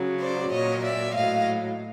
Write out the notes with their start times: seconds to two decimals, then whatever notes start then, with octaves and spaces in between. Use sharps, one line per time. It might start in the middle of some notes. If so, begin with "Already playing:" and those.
Already playing: C#3 F#3
0.20 C5 D5
0.51 A#2 F#3 C#5 D#5
0.84 D5 E5
1.15 A2 F#3 D#5 F5